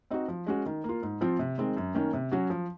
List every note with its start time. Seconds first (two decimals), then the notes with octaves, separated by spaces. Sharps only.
0.10 C4 D#4 F#4
0.28 F3
0.47 G#3 C#4 F#4
0.66 D#3
0.84 A#3
0.89 F4
1.02 G#2
1.21 F3 C4 F4
1.39 C3
1.58 D#3 G#3 C4
1.77 F#2
1.94 D#3 A#3 C#4
2.14 C3
2.32 F#3 C#4 F#4
2.50 F3